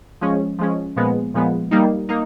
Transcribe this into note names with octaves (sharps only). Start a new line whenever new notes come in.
F3 G#3 C#4
F3 G#3 C#4
A#2 F3 G#3 B3
A#2 F3 G#3 B3
G3 A#3 D#4
A#3 D#4